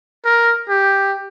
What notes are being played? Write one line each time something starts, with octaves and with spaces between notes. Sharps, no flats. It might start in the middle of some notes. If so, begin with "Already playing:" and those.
A#4
G4